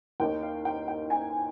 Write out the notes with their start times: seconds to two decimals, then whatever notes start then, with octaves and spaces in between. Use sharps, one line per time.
0.20 D#2 D#3 A#3 G5
0.43 F5
0.65 G5
0.88 G5
1.10 G#5